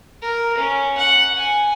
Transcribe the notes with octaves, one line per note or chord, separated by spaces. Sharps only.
A#4
C#4
F#5
G#5